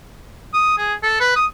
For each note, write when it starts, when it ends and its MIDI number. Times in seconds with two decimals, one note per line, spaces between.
0.53 0.78 87
0.78 0.94 68
1.03 1.15 69
1.20 1.31 71
1.36 1.46 87